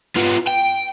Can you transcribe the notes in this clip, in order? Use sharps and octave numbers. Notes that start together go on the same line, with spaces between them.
B3 F4
G5